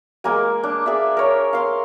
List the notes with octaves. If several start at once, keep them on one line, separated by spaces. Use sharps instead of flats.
G#3 A#3 A#4 G#5
D4
G#4 D5 E5
A#4 C#5
F5 C6